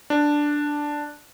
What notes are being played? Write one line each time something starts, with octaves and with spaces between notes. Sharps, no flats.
D4